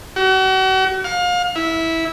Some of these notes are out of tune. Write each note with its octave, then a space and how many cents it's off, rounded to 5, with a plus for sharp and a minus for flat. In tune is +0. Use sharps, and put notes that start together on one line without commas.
F#4 +40
F5 +30
E4 -10